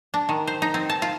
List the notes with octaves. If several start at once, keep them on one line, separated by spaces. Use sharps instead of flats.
D4
D#3
C5
D#4
C4
A5
F4